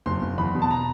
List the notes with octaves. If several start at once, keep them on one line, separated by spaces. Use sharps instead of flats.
F#1 C6
F#1
E2 B5
B2
A5
A#5